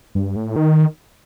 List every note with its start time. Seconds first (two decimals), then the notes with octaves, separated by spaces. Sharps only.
0.15 G2
0.36 A2
0.56 D#3